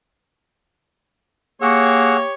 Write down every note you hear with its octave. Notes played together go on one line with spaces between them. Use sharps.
A#3 G4 G#4 C#5 F#5 E6